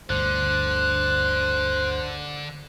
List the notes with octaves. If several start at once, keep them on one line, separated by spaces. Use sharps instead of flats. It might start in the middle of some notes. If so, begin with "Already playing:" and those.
G1 D2 D3 C5 F#6